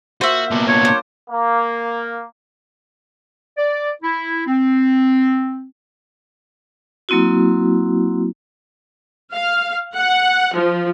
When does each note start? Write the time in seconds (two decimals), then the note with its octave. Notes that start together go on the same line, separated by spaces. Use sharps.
0.21 A#2 F#4 C5 E5
0.51 A#2 F#3 G3 B3 D4
0.68 D4 F4 C#5
0.85 G3 D4 C5 D5
1.31 A#3
3.58 D5
4.02 E4
4.47 C4
7.09 F#3 A#3 C4 E4 F#4
9.33 F5
9.96 F#5
10.56 F3